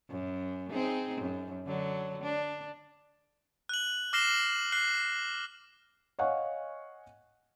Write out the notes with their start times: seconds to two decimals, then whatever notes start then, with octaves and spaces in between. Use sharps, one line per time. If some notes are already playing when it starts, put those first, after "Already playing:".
0.10 F#2
0.71 C4 D#4 G#4
1.21 F#2
1.67 D3 F#3
2.24 D4
3.69 F#6 F#7
4.13 D6 F6 A#6 C7 E7 G7
4.72 F#6 C7 G7
6.19 C#5 D#5 F5 F#5 G#5 C#6